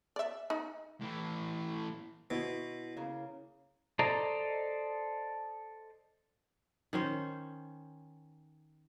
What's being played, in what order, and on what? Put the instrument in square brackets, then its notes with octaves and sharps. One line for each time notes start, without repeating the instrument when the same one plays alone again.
[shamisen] D5 E5
D#4
[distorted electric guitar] A2 E3
[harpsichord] B2 [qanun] E4 C6
[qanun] C#3 A#3
[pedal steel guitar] A4 C5 D5 D#5 A#5
[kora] D#3 C#4 C5